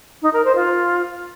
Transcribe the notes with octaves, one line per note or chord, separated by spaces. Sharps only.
D#4
A#4
C5
F4